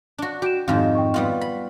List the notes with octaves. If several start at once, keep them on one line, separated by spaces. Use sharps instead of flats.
D4 F#4
F#4 G4 D7 E7
F2 G#2 D#3 F5
G5 C#6
G3 B3 F4
B5